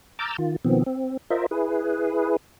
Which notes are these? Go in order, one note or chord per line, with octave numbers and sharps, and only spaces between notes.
A#5 D6 E6 F6 G6 A6
D#3 F4
B2 D#3 F3 B3 C4
C4
F4 A#4 C5 D#5 E5
E4 G#4 B4